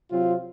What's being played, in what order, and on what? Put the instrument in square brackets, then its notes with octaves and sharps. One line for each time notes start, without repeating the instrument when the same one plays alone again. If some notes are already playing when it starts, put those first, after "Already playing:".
[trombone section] C3 F#3 C4 F4